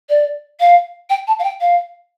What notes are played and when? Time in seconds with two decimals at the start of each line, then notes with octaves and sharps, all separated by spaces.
0.09 D5
0.60 F5
1.10 G5
1.27 A5
1.39 F5
1.44 G5
1.61 F5